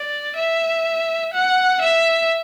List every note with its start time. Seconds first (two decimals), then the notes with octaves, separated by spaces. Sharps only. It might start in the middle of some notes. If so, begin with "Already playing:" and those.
Already playing: D5
0.36 E5
1.34 F#5
1.82 E5